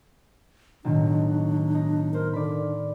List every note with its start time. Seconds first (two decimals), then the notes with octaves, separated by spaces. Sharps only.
0.84 B1 A2 D#3 D4
1.75 D#4
2.14 A#4 C5
2.33 D3 D5 B5